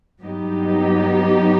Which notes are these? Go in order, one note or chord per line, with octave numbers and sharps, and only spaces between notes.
G2 F#3 B3 D#4 G4